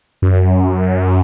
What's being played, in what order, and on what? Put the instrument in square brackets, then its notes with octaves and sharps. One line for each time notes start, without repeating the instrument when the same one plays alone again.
[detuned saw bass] F#2